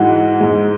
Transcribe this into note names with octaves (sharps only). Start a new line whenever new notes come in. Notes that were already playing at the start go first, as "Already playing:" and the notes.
Already playing: G#2 E3 G#3 F#4
G#2 G#3